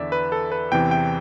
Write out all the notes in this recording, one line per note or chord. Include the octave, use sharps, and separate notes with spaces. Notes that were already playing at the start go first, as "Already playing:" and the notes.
Already playing: E2 D3 D5 E5
B4
A4
B4
E2 C3 E3 G5
G5